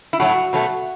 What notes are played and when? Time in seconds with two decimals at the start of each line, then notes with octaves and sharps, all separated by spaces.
0.13 E4
0.20 A2 F#3 A3 F#4
0.53 B2 F#3 A3